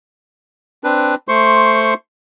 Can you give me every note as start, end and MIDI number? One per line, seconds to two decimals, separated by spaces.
0.84 1.15 60
0.84 1.15 62
0.84 1.15 71
1.28 1.94 57
1.28 1.94 72
1.28 1.94 84
1.28 1.94 85